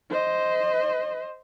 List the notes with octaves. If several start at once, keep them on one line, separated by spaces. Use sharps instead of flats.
C5 D#5